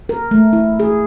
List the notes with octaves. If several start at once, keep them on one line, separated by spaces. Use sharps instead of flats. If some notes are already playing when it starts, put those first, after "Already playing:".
A#4
A3
E4
G#4